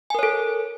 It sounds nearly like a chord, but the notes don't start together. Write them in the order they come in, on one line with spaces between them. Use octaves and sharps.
G#5 A#4 C#5 A4